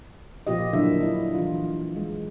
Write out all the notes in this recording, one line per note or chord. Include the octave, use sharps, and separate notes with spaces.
A#2 F3 F4 G4 D#5
D3 F#3 A#3 D4 E4 E5
E4 D#5
E3 F4
G#3